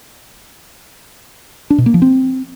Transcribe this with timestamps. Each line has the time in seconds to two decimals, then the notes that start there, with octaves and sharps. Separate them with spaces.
1.70 D4
1.78 B2
1.86 A#3
1.94 F3
2.02 C4